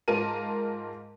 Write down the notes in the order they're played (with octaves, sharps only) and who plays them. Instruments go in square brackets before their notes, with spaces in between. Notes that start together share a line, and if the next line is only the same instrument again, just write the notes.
[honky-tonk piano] G#2 F4 A#4 A5 D#7